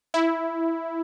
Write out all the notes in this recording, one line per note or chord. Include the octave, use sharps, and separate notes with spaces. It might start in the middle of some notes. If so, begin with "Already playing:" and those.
E4